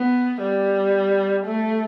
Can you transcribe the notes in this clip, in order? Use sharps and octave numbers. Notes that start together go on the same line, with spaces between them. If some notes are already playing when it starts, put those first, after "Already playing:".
Already playing: B3
G3
A3